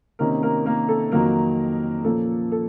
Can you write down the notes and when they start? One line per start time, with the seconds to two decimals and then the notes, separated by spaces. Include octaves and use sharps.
0.19 C3 D#3 A#3 C#4 A#4
0.43 A#3 A#4
0.66 A#3 A#4
0.88 A4
1.12 F2 D#3 F#3 A#3 A#4
2.04 A#2 F3 A#3 C#4 A4
2.52 A4